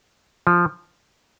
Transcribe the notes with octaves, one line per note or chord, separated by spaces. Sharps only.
F3